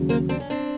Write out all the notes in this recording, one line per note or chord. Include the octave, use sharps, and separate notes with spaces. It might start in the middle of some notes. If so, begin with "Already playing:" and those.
Already playing: D#2 C#3 F#3
A#3 C4
C4 D4
C#4
C4 D4